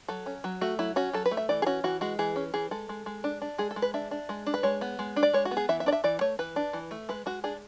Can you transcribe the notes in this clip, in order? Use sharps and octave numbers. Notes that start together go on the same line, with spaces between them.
F#3 A4
C#4
F#3
A3 F#4
F#3 E4
C#4 F#4
F#3 A4
B4
A3
E5
E3 D5
G#4
C#4 F#4
E3 F#4
G#3 F#4
E3 G#4
C#4
E3 G#4
G#3 A4
G#3
G#3
D4
D4
G#3 G#4
A4
G#3
B4
D4 E5
D4
G#3
D4
B4
G#3 C#5
B3
G#3
D4
D5
G#3 C#5
F#4
B3
G#4
E3 E5
E5
D4 D5
E5
E3 D5
A3 C#5
E3 B4
D4
E3
A3
G#3 B4
G#3 F#4
D4 G#4